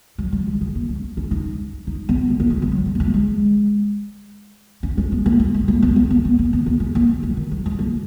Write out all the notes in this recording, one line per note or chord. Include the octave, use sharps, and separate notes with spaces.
F#3
F#3
G#3
G#3
A#3
C#4
C#4
D#4
D#4
B3
B3
A#3
G#3
F3
F#3
G#3
B3
A#3
G#3
C#4
C#4
B3
A#3
G#3
G#3
A#3
B3
B3
B3
A#3
A#3
B3
A#3
G#3
A#3
G#3
F#3
D#3
F#3
G#3
A#3